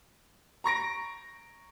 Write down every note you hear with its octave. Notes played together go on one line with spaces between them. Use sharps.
A#5 C#6 A#6 D7